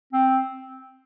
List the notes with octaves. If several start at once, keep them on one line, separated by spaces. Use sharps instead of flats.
C4